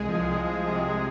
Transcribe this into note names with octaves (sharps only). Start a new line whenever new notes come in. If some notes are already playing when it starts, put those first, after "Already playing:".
Already playing: C2 G#3 G#4
F3
C2
C3